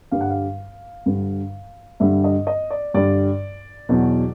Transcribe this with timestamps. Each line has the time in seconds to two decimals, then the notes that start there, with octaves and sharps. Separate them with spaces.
0.11 G2 D3 G3 F5
0.21 F#5
0.30 F5
1.06 G2 D3 G3
2.00 G2 D3 G3 E5
2.24 D#5
2.47 D#5
2.70 D5
2.94 G2 D3 G3 D5
3.89 E2 B2 F#3